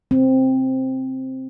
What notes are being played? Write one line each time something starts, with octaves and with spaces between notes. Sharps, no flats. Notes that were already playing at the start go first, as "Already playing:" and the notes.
C4